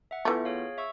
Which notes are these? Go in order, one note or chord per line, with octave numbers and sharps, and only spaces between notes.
E5 F#5
E3 A3 B3 F4
G#4 C#5 F5
E5 C#6 E6